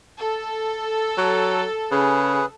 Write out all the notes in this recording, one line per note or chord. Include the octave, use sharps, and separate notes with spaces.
A4
F#3
C#3 G#4 B4